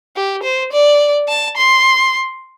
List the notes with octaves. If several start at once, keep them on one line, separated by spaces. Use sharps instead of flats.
G4
C5
D5
A5
C6